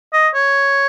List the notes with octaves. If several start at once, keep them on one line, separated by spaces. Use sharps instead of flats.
D#5
C#5